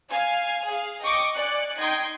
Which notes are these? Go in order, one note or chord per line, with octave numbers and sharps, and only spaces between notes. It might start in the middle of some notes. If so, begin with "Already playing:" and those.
F5 G#5 G#6
G#4 F5
D#5 G5 C#6 D6
D5 G#5 F#6 C#7
D#4 D#5 G5 C6 G6 G#6